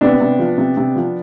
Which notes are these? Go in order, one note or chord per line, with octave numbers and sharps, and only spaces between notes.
C3 B3 D4
C3
F3
C3
C3
F3